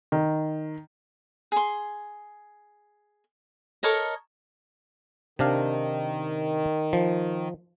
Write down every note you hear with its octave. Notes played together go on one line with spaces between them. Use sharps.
D#3
G#4 C6
A4 A#4 C#5 D#5
C3 D#3 D4 F5
F3